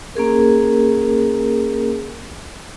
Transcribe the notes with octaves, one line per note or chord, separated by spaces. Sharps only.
A#3 C#4 G#4 A#4